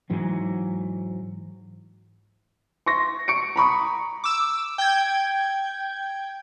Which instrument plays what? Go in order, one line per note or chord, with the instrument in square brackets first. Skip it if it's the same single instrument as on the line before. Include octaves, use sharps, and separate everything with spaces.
[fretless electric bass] G#2 E3 F#3
[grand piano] C6 C#6 A#6
C#6 C#7 D7
A#5 B5 C#6 D#6
[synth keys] D6 E6
G5 G6 G#6